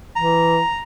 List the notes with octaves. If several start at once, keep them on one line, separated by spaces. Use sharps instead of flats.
E3 A#5